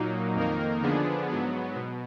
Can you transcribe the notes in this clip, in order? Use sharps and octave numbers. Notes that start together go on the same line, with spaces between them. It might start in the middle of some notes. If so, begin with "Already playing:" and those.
Already playing: A#2 F#3 A#3 D#4
F2 D#3 A#3 D#4 A#4
D3 F3 B3 D4 G#4
G#2 F#3 B3
B2